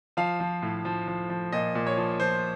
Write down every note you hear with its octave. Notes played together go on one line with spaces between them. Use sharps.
F3 F5
F3
A2
F3
F3
F3
A#2 D#5
A#2
C#5
F3
F3 C5